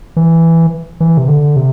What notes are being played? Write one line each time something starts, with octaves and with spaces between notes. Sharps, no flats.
E3
E3
C3
D3
C3